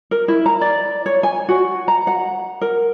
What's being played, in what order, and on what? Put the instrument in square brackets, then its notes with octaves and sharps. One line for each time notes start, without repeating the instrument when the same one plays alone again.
[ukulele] A#4
E4
A#5
D5
C#5
G#5
F#4
A#5
F#5
A#4